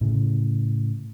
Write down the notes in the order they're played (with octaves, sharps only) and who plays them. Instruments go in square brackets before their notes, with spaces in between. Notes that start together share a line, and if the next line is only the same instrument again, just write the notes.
[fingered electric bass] A2 C#3